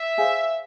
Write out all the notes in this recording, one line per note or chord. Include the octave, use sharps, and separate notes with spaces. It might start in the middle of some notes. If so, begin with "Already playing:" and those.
Already playing: E5
G#4 C5 F5 G#5